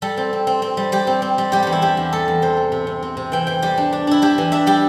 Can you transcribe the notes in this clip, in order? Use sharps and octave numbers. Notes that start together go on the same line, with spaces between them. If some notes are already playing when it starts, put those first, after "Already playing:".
G3 A4
C4
C4
C4
C4
G3
G3 G4
C4
C4
G3
G3 G4
E2 G4
E4
G3 G4
E2
G3 A4
E2
C3 C5
C4
C3
C3
C4
C3
E3 G5
E3 G5
G3 G4
D4
D4
D4 E4
D4 G4
E3
D4 E5
G3 G4